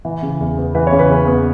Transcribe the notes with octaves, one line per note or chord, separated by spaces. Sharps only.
E3
C#3
E2
B3
E3 B4
C#5
C#3
B4
E2
B3